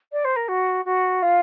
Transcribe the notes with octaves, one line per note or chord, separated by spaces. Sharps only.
D5
C5
A#4
F#4
F#4
F4